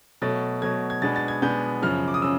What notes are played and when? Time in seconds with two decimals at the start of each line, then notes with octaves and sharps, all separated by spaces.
0.22 B2 F#3 A3 A6
0.62 B2 F#3 A3 G#6
0.90 G#6
1.02 B2 G#3 B3 D4 A6
1.16 A6
1.28 G#6
1.42 B2 G#3 B3 D4 G6
1.82 F#2 C#3 F3 F6
2.08 D6
2.14 D#6
2.22 C#3 E6